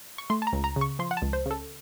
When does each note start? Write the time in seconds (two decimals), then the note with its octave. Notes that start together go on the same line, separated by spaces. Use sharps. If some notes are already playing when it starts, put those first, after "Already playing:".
0.18 C#6
0.30 A3 C6
0.42 A5
0.47 A#5
0.53 C#2
0.64 A#5
0.76 C#3
0.81 C#6
0.99 F3 C6
1.11 F#5
1.17 A5
1.22 C#2
1.33 C5
1.46 C#3 A4